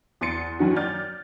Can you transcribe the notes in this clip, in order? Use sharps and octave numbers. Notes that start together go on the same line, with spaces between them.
E2 C6 A6 C#7
F#2 D#3 F#4
D5 F6 G6 A6